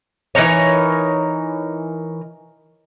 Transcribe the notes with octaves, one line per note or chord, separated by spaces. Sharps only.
E3 D#4 A#4 C#5